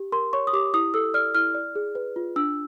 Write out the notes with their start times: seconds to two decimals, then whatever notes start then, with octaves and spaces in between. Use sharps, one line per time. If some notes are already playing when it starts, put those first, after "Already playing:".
Already playing: G4
0.12 A#4 C6
0.33 C#5 C#6
0.47 D#6
0.53 G4 D6
0.74 E4 D#6
0.94 A4 E6
1.14 D5 F6
1.35 E4 F6
1.55 D5
1.75 G#4
1.95 B4
2.16 F4
2.36 D4 E6